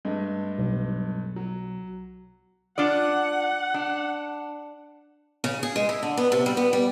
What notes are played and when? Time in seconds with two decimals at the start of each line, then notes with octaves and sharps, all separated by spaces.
0.05 G2 G#3 A3
0.58 B1
1.36 F#3
2.78 D4 F4 D5 F#5
3.74 D4
5.44 C#3
5.63 G#4
5.76 G#3
5.89 E4
6.03 D3
6.17 B3
6.32 C3
6.46 G3
6.57 B3
6.73 G3